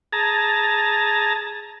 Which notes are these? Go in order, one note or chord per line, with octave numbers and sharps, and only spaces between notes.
G#4 A5 A#5